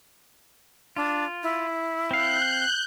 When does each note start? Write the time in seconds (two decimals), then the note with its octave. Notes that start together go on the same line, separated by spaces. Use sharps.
0.96 D4 F4
1.43 E4
2.11 C4 F5 F#6 G6